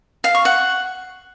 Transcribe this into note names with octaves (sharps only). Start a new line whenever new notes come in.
F5
C#6
F#5